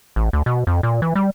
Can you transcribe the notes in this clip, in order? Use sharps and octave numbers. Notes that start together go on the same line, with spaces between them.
A1
D2
B2
F2
A#2
E3
G3